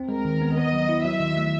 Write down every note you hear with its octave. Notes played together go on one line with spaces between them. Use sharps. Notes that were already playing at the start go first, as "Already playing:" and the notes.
Already playing: C4
G#3 A#4
D#3
B3
B3 D#5
F#3
E4
F#3 E5
D#3
A3